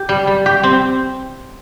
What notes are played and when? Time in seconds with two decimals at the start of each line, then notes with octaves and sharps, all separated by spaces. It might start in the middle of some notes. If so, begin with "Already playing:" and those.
Already playing: G4
0.09 G3
0.27 G3
0.46 G4
0.63 C4